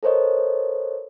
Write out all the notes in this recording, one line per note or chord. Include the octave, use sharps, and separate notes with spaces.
A4 A#4 C5 C#5 D#5